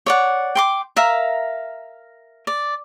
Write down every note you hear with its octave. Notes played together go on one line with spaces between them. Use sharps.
C#5 D5 F#5
G5 C6 D6
A#4 E5 F5 A#5
D5